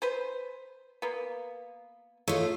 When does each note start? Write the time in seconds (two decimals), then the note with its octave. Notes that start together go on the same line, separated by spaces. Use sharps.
0.02 B4 C5
1.02 A#3 B3
2.28 A3 E4 F4 C#5 D#5